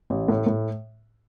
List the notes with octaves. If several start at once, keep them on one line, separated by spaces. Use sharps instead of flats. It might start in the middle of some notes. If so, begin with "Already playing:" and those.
A1
A2
A2